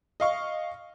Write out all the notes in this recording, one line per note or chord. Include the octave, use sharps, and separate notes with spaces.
D#5 F5 C#6